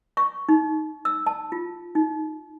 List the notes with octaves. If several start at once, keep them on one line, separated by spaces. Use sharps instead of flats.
C#6
D#4
E6
A5
F4
D#4